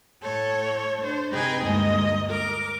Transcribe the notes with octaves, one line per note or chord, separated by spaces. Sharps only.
A2 A3 A4 C#5
D4 C5
C3 D#4 G#4 B4 G5 G#5
D2 G2 G#3 A#3 D#5
A#4 D6